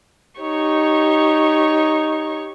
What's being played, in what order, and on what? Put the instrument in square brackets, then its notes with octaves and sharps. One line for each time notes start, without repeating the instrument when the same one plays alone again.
[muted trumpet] D#4 [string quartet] G4 C#5 C#6